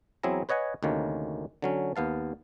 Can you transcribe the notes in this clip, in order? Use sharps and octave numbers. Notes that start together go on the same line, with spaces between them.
E2 F#3 C4 E4 G#4 A#5
B4 C#5 D#5 F#5 G#5
D2 C3 D#3 A#3 C#4
D3 F#3 C#4
D#2 B3 F5 A5